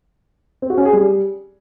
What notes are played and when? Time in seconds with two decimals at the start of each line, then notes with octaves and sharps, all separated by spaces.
0.62 C4
0.70 F#4
0.78 C#4
0.85 G#4
0.93 G3